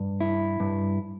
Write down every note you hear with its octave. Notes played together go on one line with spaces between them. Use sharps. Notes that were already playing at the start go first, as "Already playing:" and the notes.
Already playing: G2
E4
G2